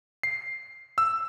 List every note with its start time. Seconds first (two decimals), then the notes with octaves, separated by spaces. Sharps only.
0.23 C7
0.98 E6